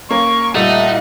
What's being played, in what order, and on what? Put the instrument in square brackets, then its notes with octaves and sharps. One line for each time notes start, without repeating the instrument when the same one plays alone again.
[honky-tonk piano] A#3 C#4 [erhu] C#6
[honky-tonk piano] A#2 G3 [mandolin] A3 [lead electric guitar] D#4 [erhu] F#5